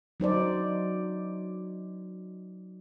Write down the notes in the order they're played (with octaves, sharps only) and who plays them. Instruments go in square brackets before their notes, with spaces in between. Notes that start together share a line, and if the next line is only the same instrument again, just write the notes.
[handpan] F#3 D#4 C5 D5